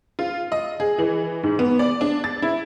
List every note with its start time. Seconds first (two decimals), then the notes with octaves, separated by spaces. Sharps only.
0.19 F4
0.52 D#5
0.80 G#4
0.99 E3
1.43 G#2
1.59 B3
1.79 D5
2.01 D4
2.24 A6
2.42 E4